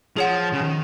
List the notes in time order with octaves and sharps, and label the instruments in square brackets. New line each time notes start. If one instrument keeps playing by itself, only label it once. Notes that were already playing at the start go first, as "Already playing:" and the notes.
[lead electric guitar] F3 [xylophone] G#4 C#5 F#5
[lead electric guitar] C#3
D#3